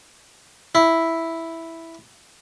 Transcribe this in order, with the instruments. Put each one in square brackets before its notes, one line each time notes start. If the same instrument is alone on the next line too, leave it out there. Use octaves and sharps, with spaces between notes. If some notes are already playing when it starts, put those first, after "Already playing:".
[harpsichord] E4